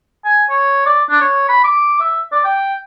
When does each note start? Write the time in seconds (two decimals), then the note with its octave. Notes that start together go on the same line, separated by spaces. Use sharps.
0.25 G#5
0.50 C#5
0.86 D5
1.10 D4
1.22 C#5
1.49 B5
1.64 D6
2.00 E5
2.32 D5
2.45 G5